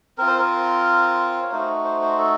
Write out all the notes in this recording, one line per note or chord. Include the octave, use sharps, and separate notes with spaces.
C4 F4 A#4
C5
A#4
C#5
A3 D#4 F#4 C5
C5
C5
A4